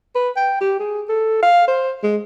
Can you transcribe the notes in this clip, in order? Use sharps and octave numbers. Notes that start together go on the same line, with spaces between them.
B4
G5
G4
G#4
A4
F5
C5
G#3